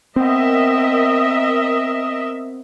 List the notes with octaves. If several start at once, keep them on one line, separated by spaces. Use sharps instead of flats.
B3 C4 A#4 D#5 E5